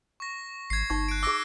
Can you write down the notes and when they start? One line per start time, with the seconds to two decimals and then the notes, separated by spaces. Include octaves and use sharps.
0.20 C#6 A#6
0.70 G#1 G#6 C7
0.90 G1 D#4 C#6
1.08 F#6 D7
1.23 G#4 D6 E6 A#6 D7